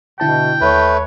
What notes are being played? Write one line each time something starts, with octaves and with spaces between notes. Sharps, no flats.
B2 D3 E4 G5 A5
D#2 A3 B4 C#5